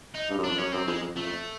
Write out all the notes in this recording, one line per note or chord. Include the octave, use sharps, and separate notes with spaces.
D#4
G2
F#2
F2 D4
F#2 C#4
F#2 C4
F2 G#3
F2
F2 A3
F2